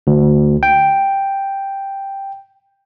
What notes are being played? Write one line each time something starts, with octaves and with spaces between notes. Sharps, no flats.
D2
G5